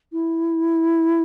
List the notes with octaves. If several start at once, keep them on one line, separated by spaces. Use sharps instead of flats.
E4